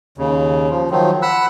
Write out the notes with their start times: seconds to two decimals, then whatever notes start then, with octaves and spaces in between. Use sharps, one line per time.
0.18 D#2 C#3
0.70 F3
0.91 D#3 F3 F#3
1.22 F#5 B5 E6 F#6